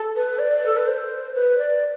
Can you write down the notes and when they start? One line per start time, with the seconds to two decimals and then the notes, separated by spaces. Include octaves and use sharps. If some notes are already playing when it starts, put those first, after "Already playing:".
Already playing: A4
0.16 B4
0.39 D5
0.66 A4
0.77 B4
0.87 C5
1.35 B4
1.58 D5